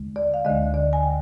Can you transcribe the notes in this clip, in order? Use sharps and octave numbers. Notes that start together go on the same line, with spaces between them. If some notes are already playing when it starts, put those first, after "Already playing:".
Already playing: D#2 D3 G#3
D5
F5
D2 D3 G#3 D#5
D5
G#5
G5